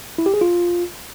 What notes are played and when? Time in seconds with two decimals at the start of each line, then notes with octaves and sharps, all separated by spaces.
0.18 E4
0.26 G4
0.34 G#4
0.41 F4